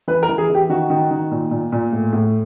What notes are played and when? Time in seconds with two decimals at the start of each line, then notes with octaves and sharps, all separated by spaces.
0.08 E3 B4
0.23 A#4
0.29 E3
0.38 G#4
0.49 E3
0.55 G4
0.69 D#3 F#4
0.90 D#3
1.11 D#3
1.31 A#2
1.51 A#2
1.72 A#2
1.92 A2
2.13 A2